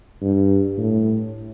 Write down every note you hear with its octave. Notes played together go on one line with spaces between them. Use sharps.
G2
A2